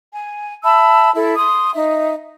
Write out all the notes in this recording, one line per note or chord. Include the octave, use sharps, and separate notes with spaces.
G#5
E5 A5 B5 E6
E4 A4 E5
C6 D#6
D#4 E5